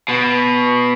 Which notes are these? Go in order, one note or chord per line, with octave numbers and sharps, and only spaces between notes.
B2